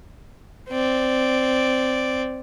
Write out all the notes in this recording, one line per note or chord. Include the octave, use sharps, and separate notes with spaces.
C4 D5